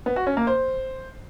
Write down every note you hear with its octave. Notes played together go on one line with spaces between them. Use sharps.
B3
F#4
C#4
A#3
C5